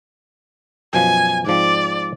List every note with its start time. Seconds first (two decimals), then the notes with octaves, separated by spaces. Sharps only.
0.93 F#2 B2 F3 G#5
1.47 G#2 F3 C4 D5